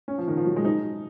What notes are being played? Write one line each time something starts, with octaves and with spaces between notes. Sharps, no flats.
C#4
F3
D#3
F3
F#3
G#3
D#4